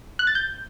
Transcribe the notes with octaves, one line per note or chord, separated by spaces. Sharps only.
F#6
A6
G6